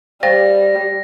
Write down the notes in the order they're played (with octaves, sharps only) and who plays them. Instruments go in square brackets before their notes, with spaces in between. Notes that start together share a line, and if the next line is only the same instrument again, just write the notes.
[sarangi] G3 [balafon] C5 F5 G5 [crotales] A#6